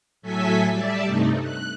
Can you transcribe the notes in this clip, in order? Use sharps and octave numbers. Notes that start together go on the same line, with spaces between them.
A2 F#3 A4 E5 G#5 B6
G3 D5 E5 A5
G2 C3 A3 D#4
F#6